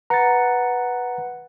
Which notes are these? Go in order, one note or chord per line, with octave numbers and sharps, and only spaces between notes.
B4 F#5 A#5 A6 C#7